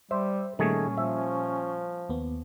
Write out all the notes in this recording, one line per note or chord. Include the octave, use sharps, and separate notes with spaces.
G3 C5 E5 E6
A#2 D#3 G3 A3 C#4 G#4
F3 E5
D#2 B3